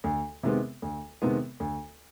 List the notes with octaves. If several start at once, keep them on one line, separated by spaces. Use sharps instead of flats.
D2
C3 D#3 G#3 B3
D2
C3 D#3 G#3 B3
D2